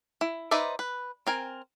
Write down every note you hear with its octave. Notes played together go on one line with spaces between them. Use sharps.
E4
D#4 B4 C5 D5 E5
B4
C4 A#4 G#5